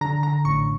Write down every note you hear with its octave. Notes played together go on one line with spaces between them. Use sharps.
D3 A#5
D3 A#5
A1 C#6